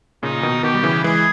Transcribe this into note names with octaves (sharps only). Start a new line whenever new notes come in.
A#2 C#3 D#4
B2 D#3
B2 D#3 G4
G3
C#3 E3
E3 G#3 G#4